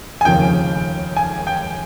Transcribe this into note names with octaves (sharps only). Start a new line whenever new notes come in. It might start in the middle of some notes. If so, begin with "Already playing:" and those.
G#5
F1 D#2 C#3 F3 A#3 G5
G#5
G5